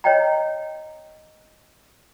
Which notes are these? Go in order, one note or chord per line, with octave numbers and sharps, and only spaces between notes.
C#5 D#5 G5 A#5